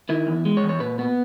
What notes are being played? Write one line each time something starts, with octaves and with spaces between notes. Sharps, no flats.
D#3 E4
E2
G#3
C#5
E2
C#5
A#2 B4
B3